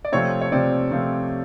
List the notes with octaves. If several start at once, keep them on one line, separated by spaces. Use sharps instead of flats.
D5
C3 F3 A3 C4 C#5
C#5
C3 F3 A3 C4 D5
C3 F3 A3 C4